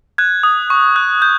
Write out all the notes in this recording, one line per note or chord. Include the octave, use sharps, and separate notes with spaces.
F#6 G#6
D#6
C#6
F#6
G6